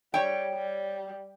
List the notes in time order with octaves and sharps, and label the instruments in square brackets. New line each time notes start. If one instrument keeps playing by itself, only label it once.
[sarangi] G3 [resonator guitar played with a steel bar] C#5 G5
[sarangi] G3